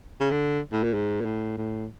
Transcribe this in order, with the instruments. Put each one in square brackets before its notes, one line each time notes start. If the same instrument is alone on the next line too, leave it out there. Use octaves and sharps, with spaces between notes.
[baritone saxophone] C#3
D3
A2
A#2
G#2
A#2
A2
A2